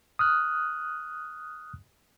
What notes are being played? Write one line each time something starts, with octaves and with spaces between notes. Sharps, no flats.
D#6 F6 F#6